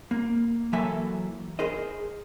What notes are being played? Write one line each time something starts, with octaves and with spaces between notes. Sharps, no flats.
A#3
E3 F#3 A#3 A4 E5 G#5
G#4 A#4 C5 D#5